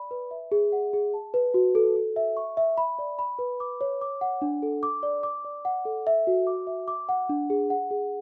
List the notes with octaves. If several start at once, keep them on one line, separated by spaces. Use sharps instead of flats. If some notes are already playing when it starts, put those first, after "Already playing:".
Already playing: D5 B5
B4
E5
G#4
F#5
G#4
A5
B4
F#4
A4
A4
E5
C#6
E5
B5
D5
B5
B4
D6
C#5
D6
F#5
D4
A4
D6
D5
D6
D5
F#5
A4
E5
F#4
D6
E5
D6
F#5
D4
G#4
F#5
G#4